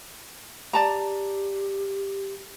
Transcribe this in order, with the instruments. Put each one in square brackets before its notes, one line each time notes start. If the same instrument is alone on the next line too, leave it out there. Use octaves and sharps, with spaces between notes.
[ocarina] G4 [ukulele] D5 A5 A#5